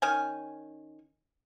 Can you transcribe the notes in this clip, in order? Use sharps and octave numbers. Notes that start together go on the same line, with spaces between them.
D#3 C#4 G#5